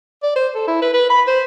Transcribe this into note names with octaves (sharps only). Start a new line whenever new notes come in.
D5
C5
A4
E4
B4
B4
B5
C5